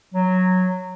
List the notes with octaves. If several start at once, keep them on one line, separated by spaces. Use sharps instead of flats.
F#3